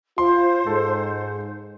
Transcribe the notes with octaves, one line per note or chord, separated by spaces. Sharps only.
F4 C5 C6
G#2 A4